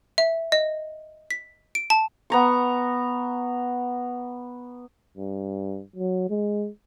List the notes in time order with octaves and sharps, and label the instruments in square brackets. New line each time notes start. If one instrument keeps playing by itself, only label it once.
[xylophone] E5
D#5
B6
D7
A5
[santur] B3 A#5 C#6
[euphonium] G2
F#3
G#3